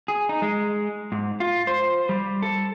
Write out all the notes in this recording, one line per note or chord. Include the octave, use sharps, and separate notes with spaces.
G#4
D#4
G#3
G#2
F4
C5
G3
A4